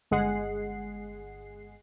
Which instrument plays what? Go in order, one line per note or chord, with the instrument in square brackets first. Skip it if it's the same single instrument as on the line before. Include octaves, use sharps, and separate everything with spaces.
[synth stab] G1 G#3 G#4 F#5 C7